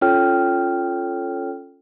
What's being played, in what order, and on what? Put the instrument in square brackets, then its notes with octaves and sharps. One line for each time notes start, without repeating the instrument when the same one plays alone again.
[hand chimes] C#4 F4 A4 C#5 G5 F6